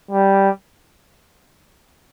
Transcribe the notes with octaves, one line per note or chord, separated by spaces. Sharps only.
G3